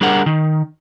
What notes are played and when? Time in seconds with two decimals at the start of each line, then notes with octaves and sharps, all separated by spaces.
0.01 G3 D4 G#4 A#4 F#5
0.26 D#3